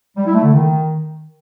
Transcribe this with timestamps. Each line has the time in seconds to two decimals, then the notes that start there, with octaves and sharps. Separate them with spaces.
0.16 G3
0.25 E4
0.34 A3
0.43 D3
0.52 D#3